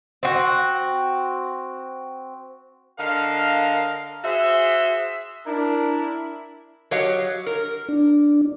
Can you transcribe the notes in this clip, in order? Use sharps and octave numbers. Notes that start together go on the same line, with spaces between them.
C4 F#4
D3 A#4 D#5 F5
F#4 G#4 C5 E5
D4 E4 A#4
F#3 G4 C#5 D#5 F5
A#4
D4